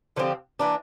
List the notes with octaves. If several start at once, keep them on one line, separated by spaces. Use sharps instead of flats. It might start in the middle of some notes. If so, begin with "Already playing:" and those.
D3 F3 C4 G4
E3 A#3 D4